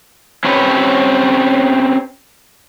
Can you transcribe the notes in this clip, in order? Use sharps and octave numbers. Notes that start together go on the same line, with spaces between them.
C4 C#4 G4 B4 C#5